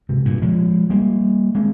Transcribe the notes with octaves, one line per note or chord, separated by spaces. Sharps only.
G#2 C3
G2 A#2
F3 G#3
G3 A#3
G#3 C4